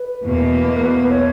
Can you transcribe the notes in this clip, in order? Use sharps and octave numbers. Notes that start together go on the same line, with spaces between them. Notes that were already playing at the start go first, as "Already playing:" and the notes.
Already playing: B4
E2 B2 A#3
A#4
B4
B4
C#5